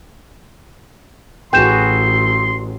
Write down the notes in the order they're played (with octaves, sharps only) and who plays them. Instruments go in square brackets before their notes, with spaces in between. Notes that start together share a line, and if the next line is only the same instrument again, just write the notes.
[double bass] A1 [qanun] F#4 G#4 B4 [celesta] G5 G6 E7 [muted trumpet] C6